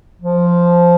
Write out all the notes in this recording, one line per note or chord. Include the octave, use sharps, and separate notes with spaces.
F3